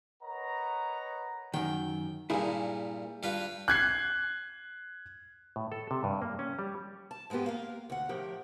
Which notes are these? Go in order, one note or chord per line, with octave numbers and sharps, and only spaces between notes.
A#4 B4 C#5 D#5 F#5 A#5
F#2 D#3 G5
G2 A#2 E4 G#4 A#4
G2 F4 B4
F#6 G#6 C7
A2
A4
C3
G2
A#3
C#4
G3
A5
G#2 G#3 A#3 B3 G4
A#3 A#4 F5
D2 F#5
A2 F3 G4 A#4